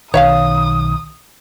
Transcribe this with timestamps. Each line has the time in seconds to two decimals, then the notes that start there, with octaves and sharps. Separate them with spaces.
0.14 B1 D#3 C#5 E5 F5 D#6